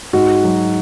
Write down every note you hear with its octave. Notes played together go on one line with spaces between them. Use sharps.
G#2 F#4
F#3